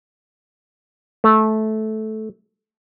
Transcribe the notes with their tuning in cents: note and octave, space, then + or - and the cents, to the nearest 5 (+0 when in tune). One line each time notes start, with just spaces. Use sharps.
A3 -15